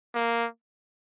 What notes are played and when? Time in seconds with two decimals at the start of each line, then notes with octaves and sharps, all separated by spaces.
0.15 A#3